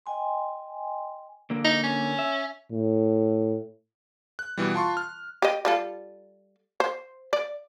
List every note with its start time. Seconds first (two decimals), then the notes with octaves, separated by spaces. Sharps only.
0.06 D#5 G5 G#5 C6
1.50 D3 A#3
1.64 D#4
1.84 C#4
2.19 E5
2.72 A2
4.39 F#6
4.58 B2 E3 G3
4.74 F4 A5 C6 C#6
4.97 F6
5.42 G4 D#5
5.65 G3 F4 A4
6.80 C5
7.33 D5